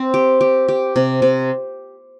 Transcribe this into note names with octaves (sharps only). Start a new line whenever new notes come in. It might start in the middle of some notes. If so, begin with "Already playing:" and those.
Already playing: C4
G4
G4
G4
C3
C3